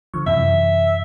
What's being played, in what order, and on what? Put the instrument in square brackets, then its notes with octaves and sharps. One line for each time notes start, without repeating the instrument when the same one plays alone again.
[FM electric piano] D3 F3 C#6
[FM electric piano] F#2 C3 E3 [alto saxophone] E5